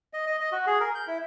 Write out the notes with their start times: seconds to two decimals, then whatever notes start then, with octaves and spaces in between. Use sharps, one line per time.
0.13 D#5
0.27 D#5
0.40 D#5
0.52 F#4
0.67 G#4
0.80 A#4
0.95 G6
1.07 E4